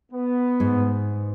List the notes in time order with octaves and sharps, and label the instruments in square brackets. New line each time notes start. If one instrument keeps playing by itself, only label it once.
[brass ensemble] B3
[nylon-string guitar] G#2